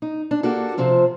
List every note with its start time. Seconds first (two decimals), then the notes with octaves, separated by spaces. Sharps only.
0.02 D#4
0.31 D4
0.43 A#3 F#4 G4 A4
0.77 C3 F3 C4 F4